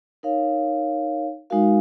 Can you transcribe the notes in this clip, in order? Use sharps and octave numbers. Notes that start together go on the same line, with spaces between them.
D#4 A#4 C#5 F5
G#3 D#4 F#4 A#4 F5